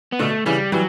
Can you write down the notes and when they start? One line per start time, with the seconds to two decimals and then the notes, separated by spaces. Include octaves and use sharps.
0.12 B3
0.19 B2 D3 A3
0.46 C#3 E3 G3
0.72 E3 F#3 G3